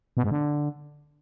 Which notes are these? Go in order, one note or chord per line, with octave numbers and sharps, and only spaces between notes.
B2
G#2
D3